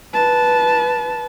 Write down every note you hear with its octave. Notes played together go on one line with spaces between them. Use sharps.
B4 A5